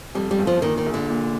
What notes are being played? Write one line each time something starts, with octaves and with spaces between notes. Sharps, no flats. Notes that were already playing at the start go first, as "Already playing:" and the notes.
F2 G3
G3
G1
F3
A#2 D#3
D#3
A#1
D3
A#2